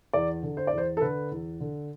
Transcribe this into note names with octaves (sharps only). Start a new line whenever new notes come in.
E2 D5
D3
C5
D5
E2
C5
A4
D3 B4
E2
D3